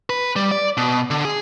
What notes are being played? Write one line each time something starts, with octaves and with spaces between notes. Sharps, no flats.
B4
G3
D5
B2
D3
G#4